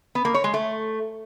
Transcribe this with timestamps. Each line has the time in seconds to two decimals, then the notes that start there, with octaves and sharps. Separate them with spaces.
0.15 B3
0.25 A#3
0.34 C#5
0.44 G#3
0.54 A3